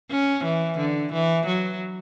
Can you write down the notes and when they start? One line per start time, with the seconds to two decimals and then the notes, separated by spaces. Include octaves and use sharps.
0.11 C#4
0.44 E3
0.79 D3
1.13 E3
1.46 F#3